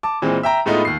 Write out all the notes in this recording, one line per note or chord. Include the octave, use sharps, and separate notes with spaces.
A5 D6
A#2 E3 G#3 C4
E5 G5 A#5
A2 G#3 A3 B3 D#4 F4
D#2 C7